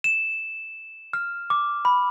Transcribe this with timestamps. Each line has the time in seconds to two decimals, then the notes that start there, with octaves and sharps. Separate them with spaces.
0.04 E7
1.13 F6
1.50 D6
1.85 B5